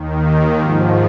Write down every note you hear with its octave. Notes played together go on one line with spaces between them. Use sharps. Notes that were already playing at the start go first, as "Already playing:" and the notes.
Already playing: D#2 D#3
G#2 F3